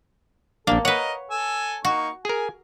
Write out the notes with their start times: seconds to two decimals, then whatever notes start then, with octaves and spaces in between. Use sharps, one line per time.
0.67 A#1 A#3 D4 A4
0.85 A#4 B4 C#5 D#5 F#5
1.31 A4 G#5 E6
1.85 A#3 D#4 F#4 C#6
2.25 G#4 A#4 G#5